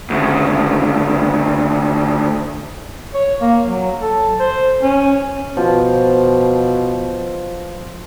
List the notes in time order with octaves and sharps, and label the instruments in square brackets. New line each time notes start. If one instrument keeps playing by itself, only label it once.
[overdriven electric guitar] D2 C#3
[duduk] C#5
A#3
F#3
A4
C5
C#4
[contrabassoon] B2 [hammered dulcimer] F3